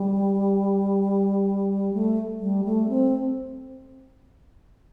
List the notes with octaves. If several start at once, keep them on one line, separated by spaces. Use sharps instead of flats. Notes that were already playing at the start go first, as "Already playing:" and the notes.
Already playing: G3
A3
G3
A3
C4